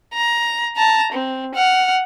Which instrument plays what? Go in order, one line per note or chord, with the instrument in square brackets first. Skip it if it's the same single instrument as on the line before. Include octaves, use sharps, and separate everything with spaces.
[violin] A#5
A5 A#5
C4
F#5 F6